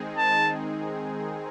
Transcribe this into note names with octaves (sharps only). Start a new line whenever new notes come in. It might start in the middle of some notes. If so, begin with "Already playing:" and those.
Already playing: D#3 G#3 C4 D#4 G#4
A5